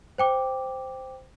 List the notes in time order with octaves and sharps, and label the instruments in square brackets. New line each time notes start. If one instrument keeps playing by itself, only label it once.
[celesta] C5 G5 D6